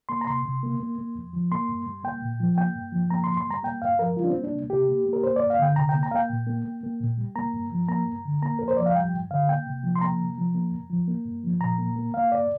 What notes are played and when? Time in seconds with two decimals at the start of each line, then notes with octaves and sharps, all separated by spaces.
0.09 A#3 C6
0.21 A#5
0.27 C3 C6
0.45 C3
0.63 A#3
0.80 A#3
0.98 A#3
1.15 F2
1.33 F3
1.52 A#3 C6
1.69 G2
1.86 G3
2.04 A#3 G5
2.22 A#2
2.40 F3
2.57 A#3 G5
2.76 G2
2.92 F3
3.10 A#3 A#5
3.24 G2 C6
3.37 C6
3.47 G3 A#5
3.63 A#3 G5
3.82 G2 F5
3.99 F3 A#4
4.16 G3 F4
4.24 D4
4.30 C4
4.35 A#3
4.44 D4
4.52 C3
4.70 C3 G4
4.88 A#3
5.06 A#3
5.13 A#4
5.23 A#3 C5
5.36 G2 D5
5.50 F5
5.59 D3 G5
5.76 C3 A#5
5.89 G5
5.95 A#3
6.03 A#5
6.11 A#3 F5 G5
6.30 A#2
6.47 A#3
6.65 A#3
6.83 A#3
7.00 A#2
7.18 G3
7.36 A#3 A#5
7.53 G2
7.72 F3
7.88 A#3 A#5
8.07 G2
8.25 D3
8.43 A#3 A#5
8.59 F2 A#4
8.68 C5
8.77 F3 D5
8.86 F5
8.95 G3 G5
9.13 G2
9.31 D3 F5
9.48 A#3 G5
9.67 C3
9.83 F3
9.96 C6
10.01 A#3 A#5
10.20 C3
10.37 F3
10.54 A#3
10.72 F2
10.90 F3
11.08 A#3
11.25 G2
11.43 F3
11.61 A#2 A#5
11.79 A#3
11.96 A#3
12.14 A#3 F5
12.32 G2 D5